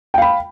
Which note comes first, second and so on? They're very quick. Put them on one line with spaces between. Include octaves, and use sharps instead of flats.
G5 F5 B5